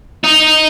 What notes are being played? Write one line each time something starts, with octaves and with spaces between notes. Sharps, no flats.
D#4